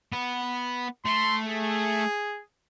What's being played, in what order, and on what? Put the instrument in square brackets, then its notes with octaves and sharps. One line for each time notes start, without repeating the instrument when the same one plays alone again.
[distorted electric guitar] B3
[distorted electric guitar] A3 [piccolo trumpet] C6
[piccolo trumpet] G#4